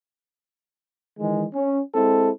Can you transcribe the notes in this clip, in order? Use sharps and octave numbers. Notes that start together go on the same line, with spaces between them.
D#3 E3 G#3
C#4
G#3 C4 E4 A4